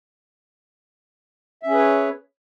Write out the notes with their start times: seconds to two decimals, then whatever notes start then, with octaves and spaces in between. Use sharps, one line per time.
1.63 E5
1.67 C#4
1.70 G#4
1.74 B4
1.78 C#5